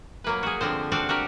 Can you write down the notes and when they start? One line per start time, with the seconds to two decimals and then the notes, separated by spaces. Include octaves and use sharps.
0.24 F#3 A#3 B4
0.43 F#4 G#4
0.61 D3 F3 C4 C5
0.92 C4 D4 F#4 F5
1.09 F#4 G4 A#4